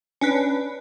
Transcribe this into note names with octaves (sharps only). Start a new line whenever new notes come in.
C#4 D4 B4